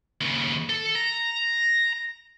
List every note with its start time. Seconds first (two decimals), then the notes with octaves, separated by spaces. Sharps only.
0.21 D#2 C#3
0.69 A4
0.95 A#5